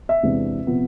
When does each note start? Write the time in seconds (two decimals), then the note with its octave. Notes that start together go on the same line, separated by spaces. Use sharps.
0.09 E5
0.23 E2 C3 G#3 B3 D4
0.67 C3 F3 B3